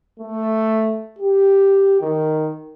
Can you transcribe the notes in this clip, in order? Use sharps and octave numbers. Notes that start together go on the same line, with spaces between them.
A3
G4
D#3